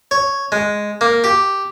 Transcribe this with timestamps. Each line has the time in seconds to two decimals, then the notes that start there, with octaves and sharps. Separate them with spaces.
0.11 C#5
0.52 G#3
1.01 A#3
1.24 G4